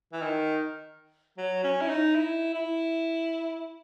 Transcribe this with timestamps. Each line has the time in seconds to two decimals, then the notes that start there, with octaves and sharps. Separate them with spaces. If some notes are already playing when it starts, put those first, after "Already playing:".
0.13 E3
0.22 D#3
1.38 F#3
1.64 C#4
1.81 E4
1.89 D#4
2.15 E4
2.54 E4